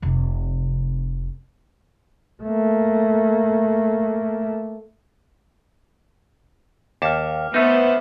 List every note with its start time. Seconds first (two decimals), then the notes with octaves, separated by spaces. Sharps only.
0.02 F1 C3
2.43 A3 A#3
7.02 D#2 A5 D6 F6
7.54 A3 B3 D#4 B4 C5 E5 C#7